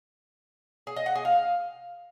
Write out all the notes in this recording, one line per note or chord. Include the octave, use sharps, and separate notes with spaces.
G#4
D#5
F#5
G#4
F5